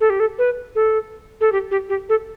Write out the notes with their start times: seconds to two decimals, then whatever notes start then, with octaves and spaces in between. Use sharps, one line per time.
0.01 A4
0.10 G4
0.20 A4
0.39 B4
0.75 A4
1.41 A4
1.52 G4
1.71 G4
1.89 G4
2.09 A4